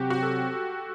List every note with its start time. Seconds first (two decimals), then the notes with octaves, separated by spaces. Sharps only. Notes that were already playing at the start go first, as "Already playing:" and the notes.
Already playing: C3 F#3 C4 F#4 G4
0.10 F#4
0.22 A4